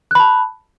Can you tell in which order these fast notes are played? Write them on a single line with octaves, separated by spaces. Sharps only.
F#6 B5 A5